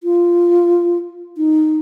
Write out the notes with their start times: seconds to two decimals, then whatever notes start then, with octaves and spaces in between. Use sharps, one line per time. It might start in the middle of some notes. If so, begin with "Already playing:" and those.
0.03 F4
1.37 D#4